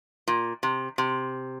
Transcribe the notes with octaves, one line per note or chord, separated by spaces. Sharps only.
A#2
C3
C3